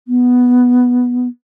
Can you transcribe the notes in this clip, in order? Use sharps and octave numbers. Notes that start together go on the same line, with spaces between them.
B3